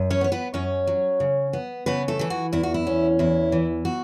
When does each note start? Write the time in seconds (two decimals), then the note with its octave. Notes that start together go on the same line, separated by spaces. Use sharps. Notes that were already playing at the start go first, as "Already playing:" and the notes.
Already playing: F#2
0.10 C#4 C#5
0.21 B3
0.24 C#5
0.32 B3 B4
0.54 F#2 C#4 C#5
0.87 F#3
1.20 C#3
1.53 B3
1.86 C#3 B3 B4
2.08 A3 A4
2.19 E3 A4
2.30 F#4
2.53 E2 E4
2.63 F#4
2.74 E4
2.87 C#4
3.19 E2 E4
3.52 E3
3.85 F#4